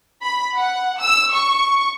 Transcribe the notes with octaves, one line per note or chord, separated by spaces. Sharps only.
B5
F#5
E6
C#6